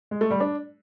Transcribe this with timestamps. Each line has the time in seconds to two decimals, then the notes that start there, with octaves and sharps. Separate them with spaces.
0.11 G#3
0.21 A3
0.31 G3
0.40 D4